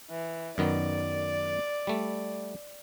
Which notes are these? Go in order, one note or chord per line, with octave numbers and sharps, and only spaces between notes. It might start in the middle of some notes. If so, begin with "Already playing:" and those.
E3
F#2 D#3 B3 D5
G3 A3